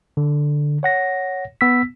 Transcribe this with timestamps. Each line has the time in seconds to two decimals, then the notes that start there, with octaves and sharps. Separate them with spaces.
0.17 D3
0.83 C#5 F#5 A#6
1.61 B3 E6 B6